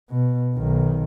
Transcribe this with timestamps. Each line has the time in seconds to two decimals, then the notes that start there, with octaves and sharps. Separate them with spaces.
0.11 B2
0.55 B1 D#3